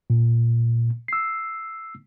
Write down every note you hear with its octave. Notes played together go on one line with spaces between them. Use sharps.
A#2
E6 C7